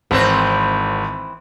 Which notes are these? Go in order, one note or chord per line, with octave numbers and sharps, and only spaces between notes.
G#1 E3 C4 B4